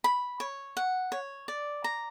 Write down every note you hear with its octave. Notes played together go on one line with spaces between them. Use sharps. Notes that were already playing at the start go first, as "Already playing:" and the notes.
B5
C#5
F#5
C#5
D5
A#5